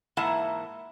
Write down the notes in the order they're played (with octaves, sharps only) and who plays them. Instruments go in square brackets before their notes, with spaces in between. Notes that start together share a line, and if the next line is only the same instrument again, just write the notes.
[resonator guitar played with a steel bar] G#2 E3 A#3 E4 F#5 A5